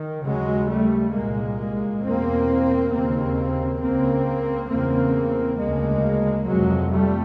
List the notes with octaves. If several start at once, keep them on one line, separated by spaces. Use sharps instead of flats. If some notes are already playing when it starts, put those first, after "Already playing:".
Already playing: D#3
D#2 C#3 F#3 G#3
G3 A3
C2 A#2 G#3 A#3
E2 B2 A#3 C4
D#2 C#3 A#3 C4
C#2 C#3 A#3 C4
E2 C#3 A#3 C4
D2 C#3 G#3 A#3
F2 C3 F#3 G#3
G3 A3